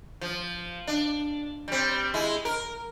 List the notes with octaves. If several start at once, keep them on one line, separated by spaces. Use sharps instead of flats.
F3
D4
G3 C4
G#3 E4
A#4